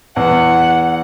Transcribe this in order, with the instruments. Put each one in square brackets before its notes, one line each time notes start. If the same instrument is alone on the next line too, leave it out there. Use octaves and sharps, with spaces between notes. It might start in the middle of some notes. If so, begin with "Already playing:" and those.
[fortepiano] E2 [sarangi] F#5